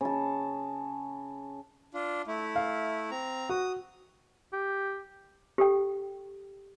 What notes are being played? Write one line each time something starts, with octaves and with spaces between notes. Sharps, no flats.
C#3 A5
D4 F4
A3 E4
F5
C4 A#5
F#4 D#6
G4
G4 A4 G5